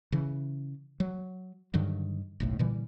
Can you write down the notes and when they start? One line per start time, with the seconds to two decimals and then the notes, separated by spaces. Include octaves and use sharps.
0.12 C#3 E3
1.00 F#3
1.74 G2 D3 D#3 F#3
2.40 F#1 B1 A2
2.59 A#2 D3 E3 G3